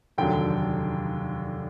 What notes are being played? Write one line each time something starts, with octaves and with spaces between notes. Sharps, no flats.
F1 D#2 D3 F#3 G5